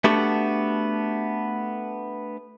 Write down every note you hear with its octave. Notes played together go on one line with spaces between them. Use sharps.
A3 B3 D4 F#4 G4 A4